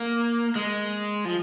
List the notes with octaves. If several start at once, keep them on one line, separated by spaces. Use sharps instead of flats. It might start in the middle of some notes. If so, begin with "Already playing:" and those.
Already playing: A#3
G#3
F3